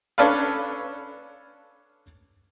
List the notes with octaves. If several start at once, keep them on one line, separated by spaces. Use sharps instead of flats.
C#4 D4 A4 B4 F5